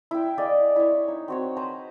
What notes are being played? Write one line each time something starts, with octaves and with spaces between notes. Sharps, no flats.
E4 G5
G#4 D5 D#5 F5
E4 C#5
D#4
C4 F#4 C#5
B4 C5 A#5